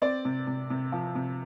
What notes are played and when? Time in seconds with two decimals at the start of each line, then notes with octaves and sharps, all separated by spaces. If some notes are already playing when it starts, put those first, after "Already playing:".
0.02 C4 D5
0.25 C3
0.47 C3
0.70 C3
0.92 F3
1.15 C3